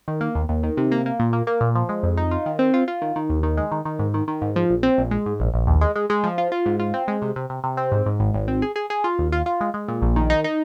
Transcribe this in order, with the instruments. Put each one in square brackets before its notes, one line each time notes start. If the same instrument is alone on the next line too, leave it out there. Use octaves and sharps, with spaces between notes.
[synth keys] D#3
A#3
D#2
D#2
D#3
C3
A#3
A#3
A#2
A#3
A#3
A#2
F3
G#3
F2
D#4
F4
D#3
C4
F4
F4
D#3
D#3
D#2
D#3
G#3
D#3
D#3
G#2
D#3
D#3
G#2
F3
A#1
C4
A#1
G#3
G#2
A#1
A#1
D#2
G#3
G#3
G#3
F3
F4
F4
G#2
F4
C4
G#3
C3
C3
C3
C3
C4
G#2
G#2
G#1
G#1
C4
G#4
G#4
G#4
F4
D#2
F4
F4
G#3
G#3
A#2
A#1
D#3
D#4
D#4